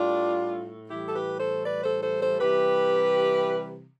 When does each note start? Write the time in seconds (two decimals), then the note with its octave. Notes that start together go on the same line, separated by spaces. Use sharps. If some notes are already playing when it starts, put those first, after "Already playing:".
Already playing: A2 G3 D4 F4
0.89 A2 E3 G3 E4 G4
1.05 A4
1.14 G4 B4
1.40 A4 C5
1.64 B4 D5
1.84 A4 C5
2.02 A4 C5
2.21 A4 C5
2.39 C3 E3 G3 G4 B4